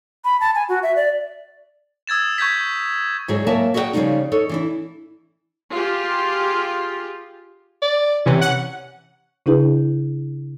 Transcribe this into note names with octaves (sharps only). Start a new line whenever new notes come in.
B5
A5
G#5
F#4
E5
D5
D#6 E6 G#6 A6 E7
C#6 G6 G#6 B6
G#2 D3 F#3 G#3 E4 G#4
F#3 A#3 A#4 E5 G#5 A5
F#4 G#4 A#4 D#5 F#5 G5
C#3 E3 F3 G3 A3 D#4
D#4 A4 C#5
E3 D4 E4
F4 G4 G#4
D5
C3 E3 C#4
F#5
C#3 D4 E4 G#4 B4